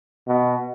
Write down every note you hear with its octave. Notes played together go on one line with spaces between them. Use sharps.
B2